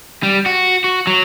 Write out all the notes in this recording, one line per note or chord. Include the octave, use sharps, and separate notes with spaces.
G3
F#4
F#4
F#3